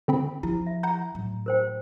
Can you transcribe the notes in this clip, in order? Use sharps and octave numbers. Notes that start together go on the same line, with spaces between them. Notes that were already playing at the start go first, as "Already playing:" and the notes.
D3 C4 B5
F3 E4
E5
F#5 A#5 G6
A2 F#3
A#4 C5 G5